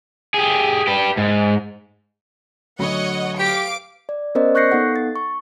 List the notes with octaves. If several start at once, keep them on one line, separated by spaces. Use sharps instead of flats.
G4 G#4
G4 B4
G#2
D2 F#3 C#5 D#5 F#5 B5
G4 F5 D6 D7
D5
B3 C#4 A#4 C5 D5 D#5
C#6 F#6 G6 A#6 C7 C#7
B3 D#4 A4 F#5
A6
C#6